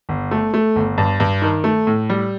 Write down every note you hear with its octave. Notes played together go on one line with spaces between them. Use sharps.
G1
A3
A3
G1
G2
G2
D#3
A3
A2
G3